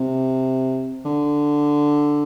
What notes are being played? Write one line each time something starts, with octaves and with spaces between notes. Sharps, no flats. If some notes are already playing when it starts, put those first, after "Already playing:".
Already playing: C3
D3